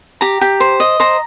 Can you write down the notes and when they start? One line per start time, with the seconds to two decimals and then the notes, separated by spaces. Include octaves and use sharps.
0.21 G4 A#5
0.41 G4
0.60 C5
0.80 D#5
1.00 C5 A#5